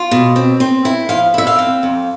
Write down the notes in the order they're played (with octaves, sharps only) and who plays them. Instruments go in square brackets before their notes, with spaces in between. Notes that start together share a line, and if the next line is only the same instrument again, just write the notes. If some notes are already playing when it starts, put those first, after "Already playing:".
Already playing: [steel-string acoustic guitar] F4
B2
C4
C4
E4
F3 F5
E4 E5
F5
C4
F2